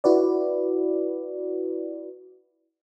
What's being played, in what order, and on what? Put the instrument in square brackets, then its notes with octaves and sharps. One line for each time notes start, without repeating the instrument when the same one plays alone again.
[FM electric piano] E4 F#4 B4 D5